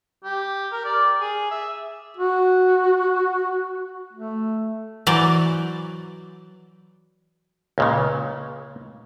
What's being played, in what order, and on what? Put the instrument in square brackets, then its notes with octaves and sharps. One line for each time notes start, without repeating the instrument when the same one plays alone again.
[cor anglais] G4
A#4
D5
G#4
E5
[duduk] F#4
A3
[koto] E3 F#3 C5 D5
[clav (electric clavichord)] C#2 A#2 C#3